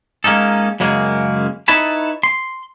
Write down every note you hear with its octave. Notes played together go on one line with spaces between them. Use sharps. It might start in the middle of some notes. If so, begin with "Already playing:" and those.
G#3 A#3 C#4 D#4 A4
F#2 C#3 G#3 A#3
D#4 E4 B4 C#5 A5 B5
C6